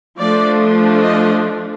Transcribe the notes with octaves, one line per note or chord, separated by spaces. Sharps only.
F3 A3 D4 D5
D#5